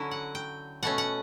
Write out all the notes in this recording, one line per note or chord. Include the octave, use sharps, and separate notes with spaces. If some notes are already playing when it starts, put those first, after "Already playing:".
Already playing: D3 F#3 C#4 E4
F#5
G5
B2 A3 C#4 F#5
F#5